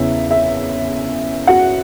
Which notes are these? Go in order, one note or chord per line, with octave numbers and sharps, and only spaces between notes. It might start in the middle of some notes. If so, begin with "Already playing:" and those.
Already playing: E2 C#3 E3 E5
E5
F#4 F#5